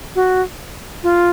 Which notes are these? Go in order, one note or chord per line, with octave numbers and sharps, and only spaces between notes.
F#4
F4